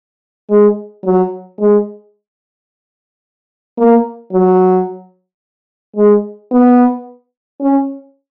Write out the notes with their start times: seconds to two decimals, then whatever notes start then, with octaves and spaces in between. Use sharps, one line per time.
0.50 G#3
1.04 F#3
1.59 G#3
3.78 A#3
4.33 F#3
5.96 G#3
6.52 B3
7.61 C#4